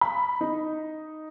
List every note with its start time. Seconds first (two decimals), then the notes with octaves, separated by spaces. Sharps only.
0.01 B5
0.41 D#4